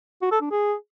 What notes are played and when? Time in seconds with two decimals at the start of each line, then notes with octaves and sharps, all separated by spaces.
0.22 F#4
0.32 A4
0.41 D4
0.51 G#4